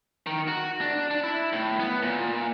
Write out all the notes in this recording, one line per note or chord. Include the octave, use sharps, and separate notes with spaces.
D#3
F#4
D4
D4
E4
A2
B3
A#2